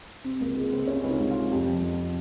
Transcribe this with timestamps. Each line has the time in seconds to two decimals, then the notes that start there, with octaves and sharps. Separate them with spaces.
0.24 C3 C4
0.40 C#2 A#3
0.56 C#2 G#3
0.72 C#2 C4
0.87 C3 C#4
1.03 C#2
1.09 D#4
1.20 C#2
1.30 F4
1.36 C3
1.51 F2 G4
1.67 F3
1.82 F2